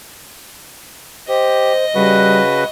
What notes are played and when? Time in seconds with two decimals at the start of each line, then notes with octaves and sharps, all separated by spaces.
1.28 G4 C5 D#5
1.95 C#3 G3 F#4 B4